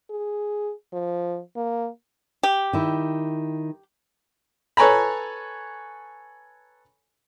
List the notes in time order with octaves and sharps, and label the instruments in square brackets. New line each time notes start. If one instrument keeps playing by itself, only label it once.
[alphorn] G#4
F3
A#3
[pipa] G4
[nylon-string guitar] D#3 E4
[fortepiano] A4 B4 C#5 G#5 A#5 B5